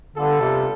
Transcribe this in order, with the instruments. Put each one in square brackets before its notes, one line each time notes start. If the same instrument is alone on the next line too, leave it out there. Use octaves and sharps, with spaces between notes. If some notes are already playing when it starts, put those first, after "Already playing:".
[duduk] D3 [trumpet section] G3 B3 D4 F4 A4
[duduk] C3